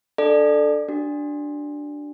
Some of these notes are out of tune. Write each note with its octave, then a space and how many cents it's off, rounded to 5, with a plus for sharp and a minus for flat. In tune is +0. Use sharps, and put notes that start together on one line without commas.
D4 +0 A4 +0 D5 +25
D4 +0 F#4 +40